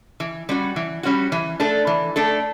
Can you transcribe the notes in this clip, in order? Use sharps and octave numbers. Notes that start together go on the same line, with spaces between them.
E3
G3 C#4 F#4
E3
G3 C#4 F#4
E3
A3 D4 A4
E3
A3 D4 A4